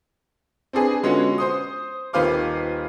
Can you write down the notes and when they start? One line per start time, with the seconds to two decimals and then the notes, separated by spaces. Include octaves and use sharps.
0.73 C4 D4 G#4 B4
1.03 D3 G#3 B3 C#4 F4 F#4
1.38 C5 C6 D#6
2.13 D#1 D#3 B4 C5 F5 D6